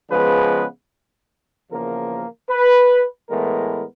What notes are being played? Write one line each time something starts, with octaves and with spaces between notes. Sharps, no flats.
C#3 F3 G#3 B3 B4
E2 C#3 F3 A#3 A#4
B4
A2 E3 G#3 B3 A#4